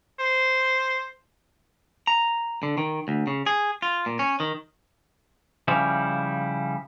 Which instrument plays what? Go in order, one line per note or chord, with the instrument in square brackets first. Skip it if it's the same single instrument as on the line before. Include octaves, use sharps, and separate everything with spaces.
[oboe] C5
[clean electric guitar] A#5
D3
D#3
D2
C#3
G#4
F4
A#2
C#4
D#3
C#3 F3 G3 E4 F4